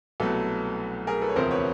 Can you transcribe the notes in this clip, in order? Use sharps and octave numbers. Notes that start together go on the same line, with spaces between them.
C2 B2 F#3 A3 A4 B4
G#4 A#4
A4 B4
C#5
E1 D2 C3 F3 A#4 C5
B4 C#5